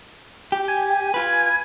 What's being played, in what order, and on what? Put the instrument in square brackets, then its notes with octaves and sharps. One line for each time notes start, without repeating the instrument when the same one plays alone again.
[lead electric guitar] G4
[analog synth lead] G#5
[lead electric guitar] F4 B4